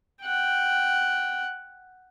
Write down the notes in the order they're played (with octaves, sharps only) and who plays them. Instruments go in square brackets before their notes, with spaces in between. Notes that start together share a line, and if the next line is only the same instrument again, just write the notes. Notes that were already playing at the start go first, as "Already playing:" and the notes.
[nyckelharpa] F#5 G5